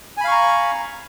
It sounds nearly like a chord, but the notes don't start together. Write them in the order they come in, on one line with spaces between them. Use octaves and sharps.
G#5 B5 F5 C#6 A#5